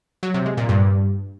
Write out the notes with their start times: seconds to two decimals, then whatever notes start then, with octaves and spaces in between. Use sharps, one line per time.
0.23 F#3
0.34 C3
0.46 G#3
0.57 A#2
0.69 G2